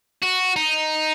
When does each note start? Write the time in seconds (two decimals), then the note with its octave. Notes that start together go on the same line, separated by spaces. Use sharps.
0.23 F#4
0.56 D#4